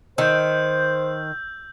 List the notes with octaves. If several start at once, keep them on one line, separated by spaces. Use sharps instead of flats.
D#3 C5 E6 G6